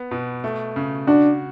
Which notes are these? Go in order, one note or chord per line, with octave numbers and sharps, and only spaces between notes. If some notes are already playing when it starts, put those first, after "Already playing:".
Already playing: B3
B2
A3
C#3
D4 F#4